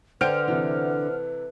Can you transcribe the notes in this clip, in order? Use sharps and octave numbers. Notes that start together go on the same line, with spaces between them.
D3 B4 C5 F#5 G5 F6 G6 D7
C3 E3